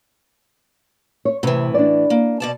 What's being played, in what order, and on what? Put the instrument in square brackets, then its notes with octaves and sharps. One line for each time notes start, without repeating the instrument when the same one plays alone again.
[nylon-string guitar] C#5
[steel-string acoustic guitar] A2 E3 [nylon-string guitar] C3 B4
[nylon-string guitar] D4 D5
[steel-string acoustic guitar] A#3
B2 D5 A5